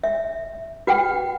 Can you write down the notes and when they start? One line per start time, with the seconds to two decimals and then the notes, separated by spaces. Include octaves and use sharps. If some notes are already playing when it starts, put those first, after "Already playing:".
0.04 E5
0.87 F#4 B4 F#5 G5